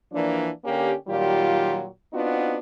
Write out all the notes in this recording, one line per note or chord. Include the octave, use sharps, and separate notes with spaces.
E3 F3 A#3 D4
D3 A#3 C#4 G4
A#2 D#3 F#3 G3 F4 G4
B3 C4 D4 D#4 F4 F#4